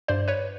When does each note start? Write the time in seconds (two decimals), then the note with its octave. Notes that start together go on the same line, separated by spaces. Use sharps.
0.08 G2 C5 D5
0.28 B4 C#5